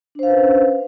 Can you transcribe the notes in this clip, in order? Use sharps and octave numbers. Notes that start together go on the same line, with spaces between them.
C#4 D4 B4 C5 F5